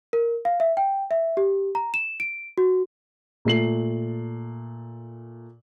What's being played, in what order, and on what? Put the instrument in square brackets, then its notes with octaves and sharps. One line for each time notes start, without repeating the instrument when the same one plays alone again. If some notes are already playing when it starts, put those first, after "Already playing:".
[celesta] A#4
F5
E5
G5
E5
G4
A#5
E7
D7
F#4
[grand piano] A#2 A3 C7 F#7